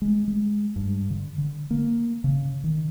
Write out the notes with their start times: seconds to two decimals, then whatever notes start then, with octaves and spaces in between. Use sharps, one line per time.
0.02 G#3
0.28 G#3
0.76 G2
1.10 D3
1.38 D3
1.71 A#3
2.24 C#3
2.64 D#3